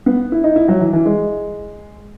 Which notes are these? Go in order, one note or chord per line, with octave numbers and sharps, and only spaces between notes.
B3
E4
D#4
E4
F#3
E3
E3
G#3